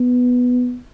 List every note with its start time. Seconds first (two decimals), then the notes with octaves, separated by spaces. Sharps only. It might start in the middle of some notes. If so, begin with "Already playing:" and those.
Already playing: B3